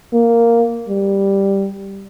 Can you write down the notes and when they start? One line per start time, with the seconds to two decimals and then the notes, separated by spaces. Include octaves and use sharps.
0.14 A#3
0.89 G3